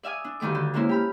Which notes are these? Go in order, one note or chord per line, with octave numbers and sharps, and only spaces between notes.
D5 E5 F5 G#5 D#6
D4
D2 G2 D#3 A3 D6
D3
G#3 A#3 C#4 E4 C5
G4 B5 F6